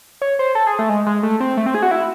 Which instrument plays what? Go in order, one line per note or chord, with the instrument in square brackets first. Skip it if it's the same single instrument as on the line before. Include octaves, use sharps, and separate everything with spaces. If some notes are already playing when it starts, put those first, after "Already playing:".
[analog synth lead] C#5
C5
A4
G#4
A3
G#3
G#3
A3
C4
A3
C4
G#4
F#4
E4